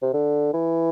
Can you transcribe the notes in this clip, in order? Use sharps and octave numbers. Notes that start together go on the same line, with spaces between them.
C3
D3
E3